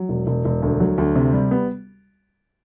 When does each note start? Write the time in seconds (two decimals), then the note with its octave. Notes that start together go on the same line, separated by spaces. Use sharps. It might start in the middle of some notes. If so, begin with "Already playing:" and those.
Already playing: F#3
0.09 E1
0.27 E1
0.45 E1
0.62 D2
0.80 F#3
0.98 D2
1.16 C3
1.33 G3
1.51 B3